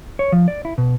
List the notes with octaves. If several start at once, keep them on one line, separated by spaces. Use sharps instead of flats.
C#5
F3
D5
E4
B2